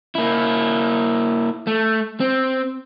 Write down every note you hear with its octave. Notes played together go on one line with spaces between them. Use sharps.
A#3 E4
A3
C4